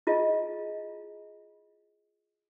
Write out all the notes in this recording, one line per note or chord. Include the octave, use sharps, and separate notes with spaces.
E4 F4 G#4 D#5